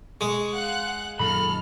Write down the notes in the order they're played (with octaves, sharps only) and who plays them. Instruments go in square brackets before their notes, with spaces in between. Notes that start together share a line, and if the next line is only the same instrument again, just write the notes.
[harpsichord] G#3 [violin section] C#6
[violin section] F5 F#5 F#6
[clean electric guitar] C#2 B5 [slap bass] F#2 A#2 D#3 [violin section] A4 F6